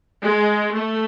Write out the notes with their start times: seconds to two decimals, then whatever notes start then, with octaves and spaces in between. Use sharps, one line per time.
0.23 G#3
0.76 A3